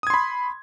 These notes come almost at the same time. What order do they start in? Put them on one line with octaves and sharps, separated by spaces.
D#6 G#6 C6 B5